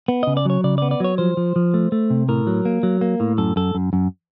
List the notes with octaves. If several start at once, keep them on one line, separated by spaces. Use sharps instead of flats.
B3
C#3 D#5
D5
F#3 C#5
C#3 D5
B3 D5
D5
F#3 C#5
F3 C5
F3
F3
A3
A3
C3
A2 A#4
F#3
A#3
F#3
A#3
A2
F#2 A4
F#2 A4
F#2
F#2